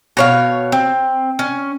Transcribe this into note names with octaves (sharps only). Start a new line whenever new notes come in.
B2 C#5 F5
C4
C#4